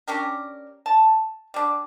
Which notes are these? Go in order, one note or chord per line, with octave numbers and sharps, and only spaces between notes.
C#4 D4 G4 A#4
A5
G3 D4